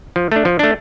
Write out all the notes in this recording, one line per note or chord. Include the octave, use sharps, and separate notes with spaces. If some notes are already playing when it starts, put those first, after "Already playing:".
F3
A3 D4
F3
A3 D4